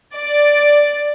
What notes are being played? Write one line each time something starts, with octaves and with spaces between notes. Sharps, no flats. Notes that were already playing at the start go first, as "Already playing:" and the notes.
D5